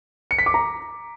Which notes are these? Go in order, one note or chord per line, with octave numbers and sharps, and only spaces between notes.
C#7
B6
D6
A#5